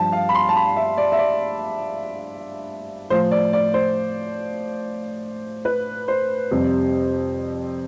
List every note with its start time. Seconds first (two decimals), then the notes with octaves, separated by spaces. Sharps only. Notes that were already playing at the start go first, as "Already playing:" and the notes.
Already playing: G2 F3 A5
0.12 F5
0.29 B5
0.35 C6
0.49 A5
0.56 B5
0.76 E5
0.98 D5
1.12 E5
1.19 D5
3.10 A2 F3 C5
3.31 D5
3.53 D5
3.74 C5
5.65 B4
6.08 C5
6.51 F2 C3 G3